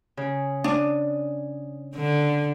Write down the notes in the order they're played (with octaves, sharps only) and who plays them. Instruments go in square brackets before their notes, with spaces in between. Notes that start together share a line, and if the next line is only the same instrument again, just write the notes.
[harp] C#3
[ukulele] D4 [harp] D#6
[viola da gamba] D3